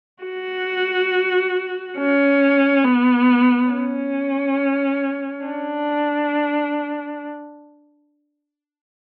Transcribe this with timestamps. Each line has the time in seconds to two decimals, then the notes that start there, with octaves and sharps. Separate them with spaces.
0.24 F#4
1.97 C#4
2.84 B3
3.70 C#4
5.45 D4